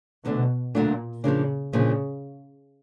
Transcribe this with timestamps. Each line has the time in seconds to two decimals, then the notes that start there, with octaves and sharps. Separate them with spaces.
0.25 D2 B2 D3 F#3 A3 D4
0.75 D2 A#2 D3 F#3 A3 D4
1.24 A#2 C#3 F3 A#3 D4
1.73 A#2 C#3 F3 A#3 D4